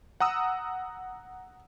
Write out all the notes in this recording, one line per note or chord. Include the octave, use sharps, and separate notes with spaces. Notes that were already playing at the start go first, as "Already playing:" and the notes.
F#5 A#5 D#6 E6